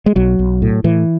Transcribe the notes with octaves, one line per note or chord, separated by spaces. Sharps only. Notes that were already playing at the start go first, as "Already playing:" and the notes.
G#3
B1 F#3
B1
A2
A2 E3